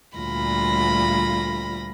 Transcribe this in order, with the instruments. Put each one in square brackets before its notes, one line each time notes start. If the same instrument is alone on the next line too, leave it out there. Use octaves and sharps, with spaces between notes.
[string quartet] D2 A#2 G3 F4 B5 A#6